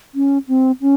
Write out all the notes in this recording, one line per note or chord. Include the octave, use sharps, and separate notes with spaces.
C#4
C4
C#4